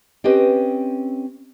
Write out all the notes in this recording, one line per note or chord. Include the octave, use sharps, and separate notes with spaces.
C4 C#4 G4 B4 D#5